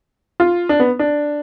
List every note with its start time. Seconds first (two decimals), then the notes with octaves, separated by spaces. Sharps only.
0.40 F4
0.69 D4
0.80 B3
0.99 D4